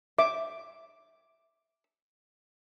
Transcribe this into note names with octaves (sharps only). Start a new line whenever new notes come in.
E5 D6